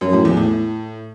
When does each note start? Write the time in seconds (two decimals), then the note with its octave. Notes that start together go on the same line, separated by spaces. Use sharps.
0.01 F#2
0.13 A2
0.25 E2
0.37 A2